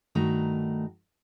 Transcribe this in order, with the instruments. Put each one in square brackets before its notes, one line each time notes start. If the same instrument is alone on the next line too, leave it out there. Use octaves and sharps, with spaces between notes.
[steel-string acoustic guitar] G2 D#3 A3 F#4 A#5